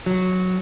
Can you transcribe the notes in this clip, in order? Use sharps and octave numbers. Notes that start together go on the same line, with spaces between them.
F#3